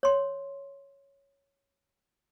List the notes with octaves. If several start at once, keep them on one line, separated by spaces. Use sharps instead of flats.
C#5 C6